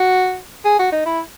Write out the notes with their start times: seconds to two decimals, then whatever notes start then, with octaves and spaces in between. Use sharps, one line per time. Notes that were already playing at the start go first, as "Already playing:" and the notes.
Already playing: F#4
0.65 G#4
0.79 F#4
0.92 D#4
1.06 E4